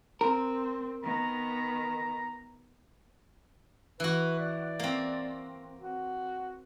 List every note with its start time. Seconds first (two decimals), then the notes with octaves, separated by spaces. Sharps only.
0.21 C4 A#4
1.03 D#3 B3 A#5
4.00 E3 F#4 B4
4.39 D5
4.79 A#3 C4
5.80 F#4